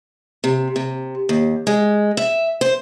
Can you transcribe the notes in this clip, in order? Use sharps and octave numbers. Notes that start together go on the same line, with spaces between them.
C3
C3
D#2
G#3
E5
C5